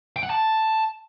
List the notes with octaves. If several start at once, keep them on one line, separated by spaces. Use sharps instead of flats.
G5
F#5
A5